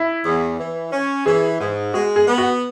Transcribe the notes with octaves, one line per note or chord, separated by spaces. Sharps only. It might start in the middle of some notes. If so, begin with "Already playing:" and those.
Already playing: E4
E2
E3
C#4
E3 G#4
G#2
G#3 F#4
G#4
B3
F#4